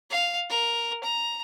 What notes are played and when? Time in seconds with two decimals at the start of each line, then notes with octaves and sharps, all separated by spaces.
0.10 F5
0.49 A#4
1.03 A#5